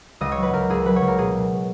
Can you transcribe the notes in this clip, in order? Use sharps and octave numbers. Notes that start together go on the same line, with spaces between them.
C#2 D#5
C#5
F#3
B4
C#2 A#4
C#2 G#4
F#3 B4
C#5
C#2
A#4
B2 G#4
B2